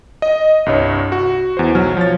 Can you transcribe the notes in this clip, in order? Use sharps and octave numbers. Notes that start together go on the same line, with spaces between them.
D#5
C2 G2 C#5
F#4
E2 C5
B1 F#3 F6
F3 C#5 A6